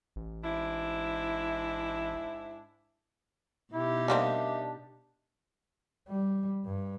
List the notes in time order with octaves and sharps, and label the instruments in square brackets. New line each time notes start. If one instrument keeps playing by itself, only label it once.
[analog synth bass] A1
[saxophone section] G#2 D4 E4
[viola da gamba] B2 D#4 G4 [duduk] E4
[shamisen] G3 A#3 C4 [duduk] D4 [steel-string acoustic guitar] D#5 E5 F#5
[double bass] G3
G2